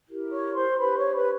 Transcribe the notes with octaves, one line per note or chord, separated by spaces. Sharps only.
E4 G4 A#4
C#5 C#6
C5 C6
D4 G4 B4 C5 B5
C#5 C#6
B4 B5